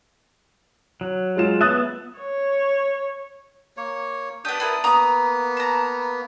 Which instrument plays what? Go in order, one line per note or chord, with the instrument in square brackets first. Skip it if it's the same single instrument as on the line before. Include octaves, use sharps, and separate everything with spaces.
[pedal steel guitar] F#3
[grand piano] G#3 F4 E7
[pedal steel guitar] B3 E5 [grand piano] D#6 F#6 A6
[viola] C#5
[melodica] A#3 C#5
[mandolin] B3 G4 [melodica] D4 D#6
[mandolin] B3 E4 A#4
[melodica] A#3 B3 [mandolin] A#5 D#6
[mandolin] A5 A#5